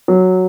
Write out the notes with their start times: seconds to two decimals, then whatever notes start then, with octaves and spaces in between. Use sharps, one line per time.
0.08 F#3